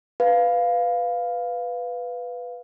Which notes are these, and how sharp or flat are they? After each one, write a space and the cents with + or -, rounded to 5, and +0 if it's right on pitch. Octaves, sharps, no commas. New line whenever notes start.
B4 +5 F5 +0